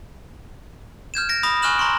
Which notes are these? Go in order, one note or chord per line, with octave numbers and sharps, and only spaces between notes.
F6 G6 G#6 E7
A#6 D7
B5 D#6 A#6
G#5 C#6 F6 F#6 E7 F#7
A#5 C6 C#6 D7